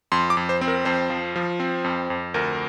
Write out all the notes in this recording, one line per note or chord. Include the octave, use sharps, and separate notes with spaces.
F2 C6
D6
F2
C5
C4
A#4
F2 C5
F3
F3
C4
F2
F2
D2 A#4